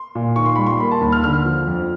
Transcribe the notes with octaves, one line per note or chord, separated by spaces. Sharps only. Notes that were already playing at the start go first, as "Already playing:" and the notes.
Already playing: C6
A#2
D#3 C#6
C6
G3 B5
C6
A#3 B5
A5
D#2 B5
F6
D3 F6
F3
F2